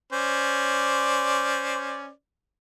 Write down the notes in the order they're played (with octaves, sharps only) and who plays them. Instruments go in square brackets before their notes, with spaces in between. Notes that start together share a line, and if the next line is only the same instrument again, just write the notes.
[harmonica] C#4 C5 D5